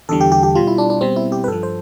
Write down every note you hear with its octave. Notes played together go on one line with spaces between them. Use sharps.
E2 D3 G3 A4
G4
G4
G4
B2 G3 F4
E4
D4
D4
B2 G3 C4
E4
G4
B4
G2 F3 A4
C5